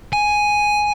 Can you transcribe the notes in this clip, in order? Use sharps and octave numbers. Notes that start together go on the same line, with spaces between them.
G#5